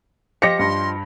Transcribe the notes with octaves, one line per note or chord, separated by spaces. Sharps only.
F3 G4 D#5 A#6 C#7
G2 C6